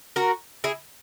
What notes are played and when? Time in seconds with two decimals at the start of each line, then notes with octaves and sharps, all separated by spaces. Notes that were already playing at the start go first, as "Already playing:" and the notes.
0.16 F#4 A#4
0.64 E4 G#4